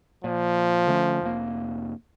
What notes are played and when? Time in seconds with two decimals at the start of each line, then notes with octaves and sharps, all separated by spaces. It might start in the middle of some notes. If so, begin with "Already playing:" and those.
0.24 A#2 F3
0.87 D3 A3 C#4
1.21 F1 A#3